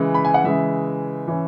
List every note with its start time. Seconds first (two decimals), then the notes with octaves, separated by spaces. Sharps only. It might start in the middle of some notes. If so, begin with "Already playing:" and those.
Already playing: C#3 E3 G#3
0.14 B5
0.25 G#5
0.34 F#5
0.44 C#3 E3 G#3 E5
1.28 E3 C#4